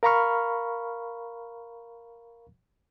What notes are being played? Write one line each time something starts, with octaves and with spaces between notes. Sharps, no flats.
A#4 F5 A#5 B5 C#6 F6